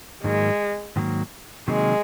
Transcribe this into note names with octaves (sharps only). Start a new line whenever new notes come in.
G#2 D#3 F#3 G#3 A#3
G#2 D#3 F#3 A#3
C3 D#3 F#3 G#3 A#3